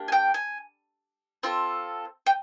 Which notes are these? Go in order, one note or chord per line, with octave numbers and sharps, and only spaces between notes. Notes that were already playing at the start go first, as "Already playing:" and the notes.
Already playing: A#3 D4 G4
G#5
G5
G#5
C4 F4 A4
G5